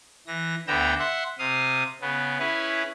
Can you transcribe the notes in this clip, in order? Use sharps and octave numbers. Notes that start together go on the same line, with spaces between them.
E3 A#6
D2 D3 B3 G5 A#5 E6
E5 F#5 C6
C3 F5 D#6
C#3 B3
C#4 E4 G#4 B4